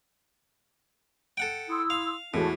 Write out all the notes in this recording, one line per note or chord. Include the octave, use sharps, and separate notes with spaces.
A4 F#5 G5
E4 C6 D#6 E6
F5
E2 A2 G#3 E4 F#4 A4 C#5 A5